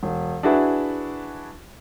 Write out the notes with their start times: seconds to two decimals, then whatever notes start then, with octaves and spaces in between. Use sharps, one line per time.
0.03 E1
0.43 D4 E4 F#4 G#4 B4